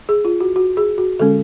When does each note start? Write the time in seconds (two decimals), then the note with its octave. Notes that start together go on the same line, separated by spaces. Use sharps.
0.09 G#4
0.25 F4
0.40 F#4
0.56 F#4
0.77 G#4
0.98 F#4
1.19 D3 G#3 C#4 A4